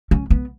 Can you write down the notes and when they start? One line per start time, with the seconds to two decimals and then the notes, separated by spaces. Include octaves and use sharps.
0.11 C#4
0.30 B3